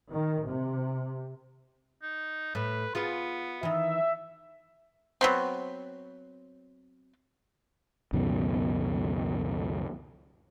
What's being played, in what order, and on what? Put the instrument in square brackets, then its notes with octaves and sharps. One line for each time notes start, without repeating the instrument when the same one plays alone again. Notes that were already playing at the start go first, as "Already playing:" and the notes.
[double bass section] D#3
C3
[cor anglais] D#4
[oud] A2 [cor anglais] B4
[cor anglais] B3 [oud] F4 G#4 B4
[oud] D#3 E3 [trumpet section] E5
[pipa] F#3 B3 C4
[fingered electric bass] C#2 F#2 B2 D#3